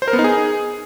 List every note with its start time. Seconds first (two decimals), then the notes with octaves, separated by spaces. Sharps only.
0.02 C5
0.08 A#4
0.13 B3
0.19 D#4
0.24 G#4